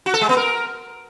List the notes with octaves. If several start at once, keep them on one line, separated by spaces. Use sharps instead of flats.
F#4
A4
G#3
B3
A#4